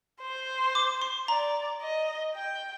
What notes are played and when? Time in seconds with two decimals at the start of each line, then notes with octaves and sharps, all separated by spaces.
0.21 C5
0.75 D6
1.02 C6
1.28 D5 A#5
1.82 D#5
2.35 G5